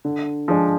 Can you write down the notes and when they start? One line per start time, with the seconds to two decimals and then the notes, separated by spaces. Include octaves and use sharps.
0.05 D3
0.48 F3 G#3 D4